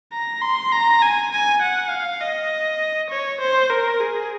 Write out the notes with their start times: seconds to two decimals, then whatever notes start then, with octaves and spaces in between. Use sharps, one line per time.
0.13 A#5
0.42 C6
0.72 A#5
1.02 G#5
1.32 G#5
1.62 F#5
1.91 F5
2.21 D#5
3.10 C#5
3.40 C5
3.70 A#4
4.00 G#4